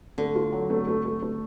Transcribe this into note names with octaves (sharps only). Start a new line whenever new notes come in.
D3 A3
F4
F#3
A3
A3
A3
A3